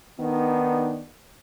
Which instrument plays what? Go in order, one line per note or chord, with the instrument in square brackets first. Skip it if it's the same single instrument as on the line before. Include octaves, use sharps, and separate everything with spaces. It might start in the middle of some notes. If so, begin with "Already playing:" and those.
[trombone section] D#3 B3 D4 D#4